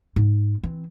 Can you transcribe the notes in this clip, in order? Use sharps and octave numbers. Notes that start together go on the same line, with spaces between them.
G#2
E3 C4